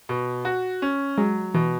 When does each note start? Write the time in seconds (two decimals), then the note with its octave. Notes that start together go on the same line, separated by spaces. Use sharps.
0.09 B2
0.45 F#4
0.82 C#4
1.17 F#3 G#3
1.54 B2 E3